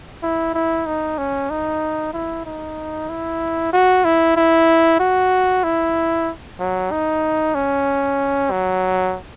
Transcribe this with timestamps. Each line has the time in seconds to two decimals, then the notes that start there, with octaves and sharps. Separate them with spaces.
0.22 E4
0.54 E4
0.86 D#4
1.18 C#4
1.50 D#4
2.14 E4
2.45 D#4
3.09 E4
3.73 F#4
4.05 E4
4.36 E4
5.00 F#4
5.64 E4
6.59 F#3
6.91 D#4
7.55 C#4
8.51 F#3